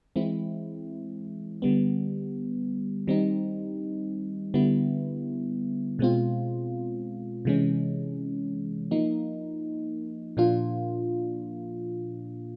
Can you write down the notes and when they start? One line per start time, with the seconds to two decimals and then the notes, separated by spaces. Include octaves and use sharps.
0.16 E3 G#3 C4 E4
1.62 D3 G3 B3
3.07 D#3 G3 C4 D#4
4.54 D3 G3 B3 E4
5.99 B2 G#3 C4 F4
7.45 C3 E3 G#3 C#4
8.91 F3 A#3 D#4
10.37 A#2 F3 A#3 D4 F4